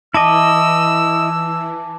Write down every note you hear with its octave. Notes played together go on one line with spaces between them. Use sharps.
E3 E4 D#5 A5 D6 E6 A#6